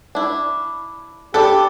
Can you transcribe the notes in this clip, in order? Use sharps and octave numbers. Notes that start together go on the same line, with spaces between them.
D4 E4
B3 D4 G4 A4 B4